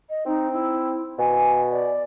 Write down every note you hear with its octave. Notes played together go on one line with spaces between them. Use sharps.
D#5
C4 D#4
E4
B2 G#5
D5